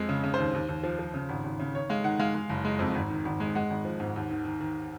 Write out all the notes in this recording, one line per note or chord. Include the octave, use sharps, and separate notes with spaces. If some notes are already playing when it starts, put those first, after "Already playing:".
Already playing: F2 G#3
C#3
C#3
D#2 C5
D#2
D#2
F3
F3
C#3
G#1
G#1
C#3
D#3 C#5
G#3 F5
D#3 F#5
G#3 F5
G#3
F#1
G#3
F2
G#1
D#3
G#1
G#3
G#3 F#5
G#1
F3
G#2
D#2
D#3
D#3
D#3